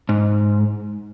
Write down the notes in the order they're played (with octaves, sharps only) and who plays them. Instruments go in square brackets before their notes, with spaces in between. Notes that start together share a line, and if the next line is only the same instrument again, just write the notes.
[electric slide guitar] G#2